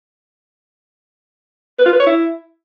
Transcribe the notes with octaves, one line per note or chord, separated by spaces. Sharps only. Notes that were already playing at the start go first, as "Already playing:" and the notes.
B4
F4
B4
C#5
E4